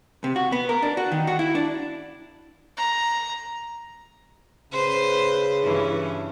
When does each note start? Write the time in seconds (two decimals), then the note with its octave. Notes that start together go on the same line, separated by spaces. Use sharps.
0.24 C3
0.36 F#4
0.52 B3
0.69 A#4
0.82 D4
0.97 F#4
1.12 D#3
1.27 F#4
1.39 E4
1.55 D4
2.77 A#5
4.72 C#3 B4 C5
5.63 G2 E3 C#4